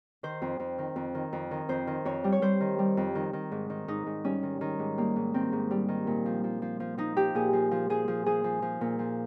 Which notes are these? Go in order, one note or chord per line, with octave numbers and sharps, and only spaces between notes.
D#3 C5
F2
F2
D#3
F2
D#3
F2
D#3
F2 C5
D#3
F2 C#5
G3
C#5
G3 C5
D#3
G3
F2
D#3
D#3
G#2
D#3
G#2 D#4
G#2
G3 C#4
D#3
D#3
G#2
G3 A#3
G#2
D#3 C4
G#2
G3
D#3
A#2
F3
F3
F3
F3
F3 D#4
F3 G4
A#2 G#4
F3
F3
F3 G#4
F3
F3 G#4
F3
F3
A#2
F3